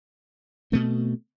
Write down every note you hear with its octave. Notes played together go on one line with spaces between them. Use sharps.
B2 A3 C4